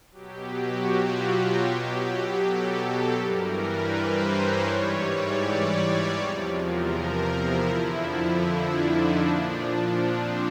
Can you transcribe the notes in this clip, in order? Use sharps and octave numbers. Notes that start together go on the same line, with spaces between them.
B2 F#3 G4
F#4
F4
G4
B2 F#3
A4
G2 E3 G3 A#4
B4
C5
C#5
G#2 E3 G3
D5
E2 C3 F3
A#4
E4
F2 D3 F3
D4
D#4
A#2 F3 D4
D4
C4